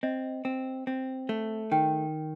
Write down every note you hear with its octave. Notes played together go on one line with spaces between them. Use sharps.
C4 D#5
C4
C4
A3
D#3 G5